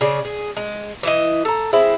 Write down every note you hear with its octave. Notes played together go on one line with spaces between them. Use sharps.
C#3 G#4 D5
G#4
G#3
E3 E4 D#5
A4 A#5
G#3 C4 E4